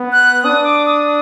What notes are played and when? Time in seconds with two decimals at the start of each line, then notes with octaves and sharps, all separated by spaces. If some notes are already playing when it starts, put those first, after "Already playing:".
Already playing: B3
0.12 F#6
0.44 D4 D#6
0.64 D6
0.86 D#6
1.06 D#6